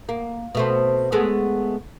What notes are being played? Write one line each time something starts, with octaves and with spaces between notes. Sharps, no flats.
A#3
B2 A3 C4
G#3 A3 B3